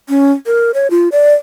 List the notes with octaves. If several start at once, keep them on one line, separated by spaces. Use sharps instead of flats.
C#4
A#4
C#5
F4
D5